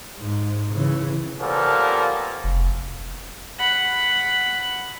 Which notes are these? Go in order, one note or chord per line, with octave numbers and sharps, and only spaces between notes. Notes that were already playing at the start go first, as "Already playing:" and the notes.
G#2
C#3 E3
F3 G3 A#3 B3 C#4 A4
F1
F#5 B5